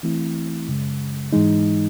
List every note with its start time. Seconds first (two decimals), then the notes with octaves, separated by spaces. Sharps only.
0.03 E3 A3 C4 E4
0.68 F#2 C#3 G#3
1.33 G#2 E3 G#3 D#4